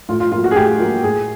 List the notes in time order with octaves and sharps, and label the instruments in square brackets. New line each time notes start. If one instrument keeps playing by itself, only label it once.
[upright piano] A2 F4
F4
A#3 F4
F#3
F#4
G#4
A2 G4
F#3 A#3
A2 G#4